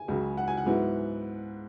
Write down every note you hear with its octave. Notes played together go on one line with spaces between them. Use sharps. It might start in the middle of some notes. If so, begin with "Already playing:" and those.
Already playing: G#5
C#2 C#3 F#3
F#5
G#5
F#5
G#2 F#3 B3 E4